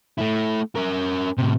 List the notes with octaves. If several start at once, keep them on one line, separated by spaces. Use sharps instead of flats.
A3 E4
C#4 A#4
A2 C3